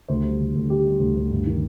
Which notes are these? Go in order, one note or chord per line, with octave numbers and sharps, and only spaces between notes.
D2 C5
G3
D3
D2
D3 G4
G3
D2
D2
G2
D#3